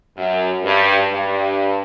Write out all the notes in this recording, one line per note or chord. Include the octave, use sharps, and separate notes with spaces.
F#2
G2
G2